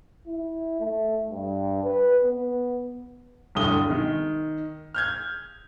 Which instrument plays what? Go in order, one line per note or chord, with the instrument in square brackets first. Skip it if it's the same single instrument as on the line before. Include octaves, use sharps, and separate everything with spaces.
[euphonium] E4
A3
G2
B4
B3
[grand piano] D1 G2 D3 D#6 G7
D#3
F6 G6 G#6